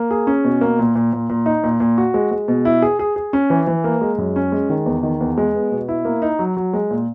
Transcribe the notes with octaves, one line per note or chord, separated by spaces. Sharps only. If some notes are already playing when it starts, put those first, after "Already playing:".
Already playing: A#3
G#4
C#4
B2
A#3
A#2
A#2
A#2
A#2
D#4
A#2
A#2
F#4
G#3
G#3
B2
E4
G#4
G#4
G#4
C#4
E3
E3
A#3
G#3
F#2
C#4
G#3
D#3
E2
D#3
E2
G#3
B3
B2
E4
A#3
D#4
F#3
F#3
G#3
A#2